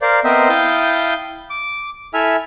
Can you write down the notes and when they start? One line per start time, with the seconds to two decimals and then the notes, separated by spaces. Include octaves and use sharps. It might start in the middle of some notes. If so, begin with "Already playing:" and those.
0.02 A#4 C5 D5 F5
0.24 B3 C4 A#4 C5 D#5 E5
0.49 E4 F5 G5 A5 D#6 G6
1.50 D6
2.14 E4 A4 E5 G#5 F6